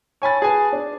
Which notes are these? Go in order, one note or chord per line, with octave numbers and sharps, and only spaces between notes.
C#5 G#5 B5 A6
G#4 B4 G#5 A5
D4